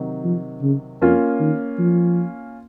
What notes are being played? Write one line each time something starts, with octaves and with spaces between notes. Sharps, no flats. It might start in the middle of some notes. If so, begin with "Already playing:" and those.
Already playing: C3 D#3 F#3
F3
C#3
F2 A#3 C#4 F4
D#3
F3